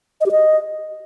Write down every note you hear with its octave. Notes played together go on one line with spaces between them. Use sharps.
D#5
G4
D#5